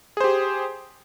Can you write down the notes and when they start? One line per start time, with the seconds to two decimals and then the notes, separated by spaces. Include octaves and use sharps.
0.17 G#4
0.21 C5
0.24 G4